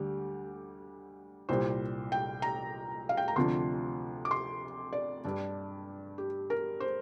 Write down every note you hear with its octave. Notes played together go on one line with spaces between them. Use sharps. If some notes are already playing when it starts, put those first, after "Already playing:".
Already playing: D2 D3 G3 G4
C2 A#2 G3 C5
G5
A#5
F5
G5
A#5
D2 C3 F3 D4 C6
D6
C6
D5
G2 G3 D4
G4
A#4
C5